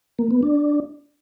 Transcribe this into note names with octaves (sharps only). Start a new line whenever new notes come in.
A#3
B3
D4